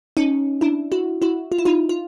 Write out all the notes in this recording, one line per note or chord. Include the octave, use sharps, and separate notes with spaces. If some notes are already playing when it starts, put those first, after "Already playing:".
C#4 D#4
D4 E4
E4 F#4
E4 F#4
F4
E4
D#4 F4
F4